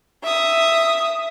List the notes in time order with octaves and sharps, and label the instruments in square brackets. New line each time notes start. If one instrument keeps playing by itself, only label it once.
[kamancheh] E5 D#6